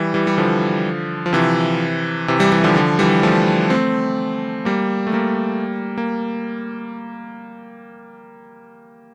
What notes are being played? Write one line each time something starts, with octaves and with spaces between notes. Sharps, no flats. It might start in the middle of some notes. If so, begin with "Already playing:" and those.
Already playing: E3 G3
E3 G3
G3
D3 F3
F3
C3 E3
C3 E3
E3 G3
E3 G3
D3 F3
D3 F3
E3 G3
F3 A3
A3 C4
G3 A#3
A3
G3 A#3
A#3